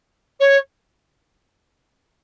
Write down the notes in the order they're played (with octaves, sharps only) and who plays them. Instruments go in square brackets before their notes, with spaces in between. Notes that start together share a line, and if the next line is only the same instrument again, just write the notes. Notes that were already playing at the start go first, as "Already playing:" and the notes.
[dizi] C#5